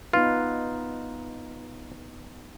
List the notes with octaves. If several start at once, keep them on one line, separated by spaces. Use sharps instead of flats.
B3 D#4 F4 B4